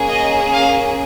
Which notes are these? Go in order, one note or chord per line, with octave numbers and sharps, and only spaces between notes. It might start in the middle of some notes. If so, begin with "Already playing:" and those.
Already playing: A#3 C#4 G#4
D#5
F5